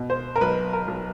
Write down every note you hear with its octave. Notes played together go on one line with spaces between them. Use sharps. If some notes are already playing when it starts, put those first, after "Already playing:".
Already playing: B2
C5
A#4
B1 B4
A#4
B1